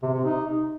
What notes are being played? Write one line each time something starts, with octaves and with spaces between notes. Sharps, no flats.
C3
C3
D#4